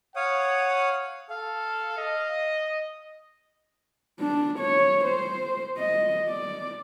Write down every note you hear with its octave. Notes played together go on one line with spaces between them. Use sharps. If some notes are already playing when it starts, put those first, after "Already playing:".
C#5 F5 F#5 D#6
A4 F5
D#5
D4
C#5
C5
D#5
D5